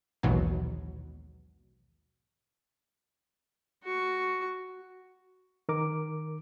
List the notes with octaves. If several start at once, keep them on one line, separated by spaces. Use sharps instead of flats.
A#1 D#2 G#2 B2 E3 F#3
F#4 C#6
D#3 A#4 D6